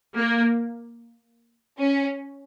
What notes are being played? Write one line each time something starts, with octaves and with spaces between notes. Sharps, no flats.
A#3
C#4